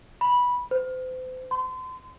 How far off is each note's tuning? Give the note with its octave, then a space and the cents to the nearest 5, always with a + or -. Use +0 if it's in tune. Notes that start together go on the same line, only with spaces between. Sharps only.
B5 -10
C5 -35
C6 -35